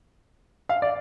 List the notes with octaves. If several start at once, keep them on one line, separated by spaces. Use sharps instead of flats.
F5
D5